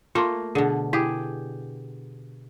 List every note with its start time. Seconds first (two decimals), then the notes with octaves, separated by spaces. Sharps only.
0.15 A3 A#3 F4 C6
0.55 B2 D3 G#4
0.93 E4 G4 G#4